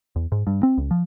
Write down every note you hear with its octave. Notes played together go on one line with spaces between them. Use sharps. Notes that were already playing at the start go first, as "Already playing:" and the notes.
E2
G#2
G2
C4
C#2
F3